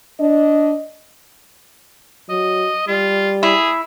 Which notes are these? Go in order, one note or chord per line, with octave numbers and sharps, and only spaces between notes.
D4 D#5
F#3 D#5
G3 F4
E4 G#4